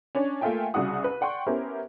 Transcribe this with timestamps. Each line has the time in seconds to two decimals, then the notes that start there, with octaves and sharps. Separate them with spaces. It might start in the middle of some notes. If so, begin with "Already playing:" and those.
0.15 C#4 D4 C#5
0.41 A3 A#3 F4 E5 G5 G#5
0.74 C2 C#3 F#4 F#5 D#6
1.04 B4
1.21 D5 F#5 G5 C6 C#6
1.46 B3 C#4 E4 G4 A#4 C5